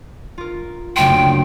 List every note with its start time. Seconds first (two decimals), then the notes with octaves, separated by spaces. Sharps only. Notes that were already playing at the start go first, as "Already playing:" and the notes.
0.38 F4 A#4
0.96 F#1 D2 G5 C6